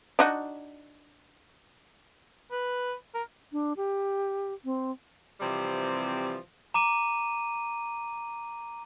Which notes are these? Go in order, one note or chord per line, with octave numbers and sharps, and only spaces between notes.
D4 D#4 F#4
B4
A#4
D4
G4
C4
C3 E3 F3 G3 C4
A#5 D6 D#7